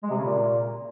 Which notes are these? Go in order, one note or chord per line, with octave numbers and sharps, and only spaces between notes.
G#3
C3
C#3
A#2